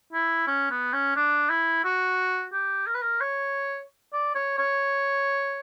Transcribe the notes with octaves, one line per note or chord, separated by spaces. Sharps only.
E4
C#4
B3
C#4
D4
E4
F#4
G4
A#4
B4
A#4
C#5
D5
C#5
C#5